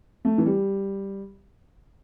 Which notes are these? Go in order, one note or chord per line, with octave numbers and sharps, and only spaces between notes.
A3
E3
G3